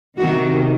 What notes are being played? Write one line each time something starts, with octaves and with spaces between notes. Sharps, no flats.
C3 D#3 F#4